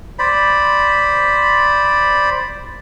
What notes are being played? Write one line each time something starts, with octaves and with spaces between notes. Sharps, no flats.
C5 D5 B5